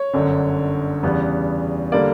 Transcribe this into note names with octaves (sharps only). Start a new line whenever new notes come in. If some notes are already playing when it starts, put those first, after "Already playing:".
Already playing: C#5
G1 F#2 D3
E2 C#3 G3 B3
D3 G3 A#3 D5